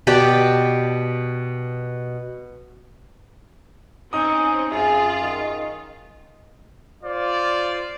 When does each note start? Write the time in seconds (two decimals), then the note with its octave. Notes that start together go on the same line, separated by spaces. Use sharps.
0.07 B2 G4 D5 A5
4.13 C4 C#4 D#4 D#6
4.71 F#2 F4 G#4
5.24 D#3
7.03 F4 C5 D5